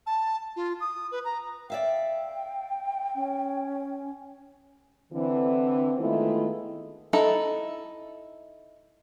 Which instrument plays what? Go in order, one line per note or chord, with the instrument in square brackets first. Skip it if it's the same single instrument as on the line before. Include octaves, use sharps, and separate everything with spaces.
[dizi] A5
F4
D#6
B4
A#5
[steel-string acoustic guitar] D5 E5 F5 [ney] G5
[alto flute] C#4
[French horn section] D3 E3 C4
D#3 G#3 A3 B3 E4 F4
[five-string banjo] D#4 E4 A4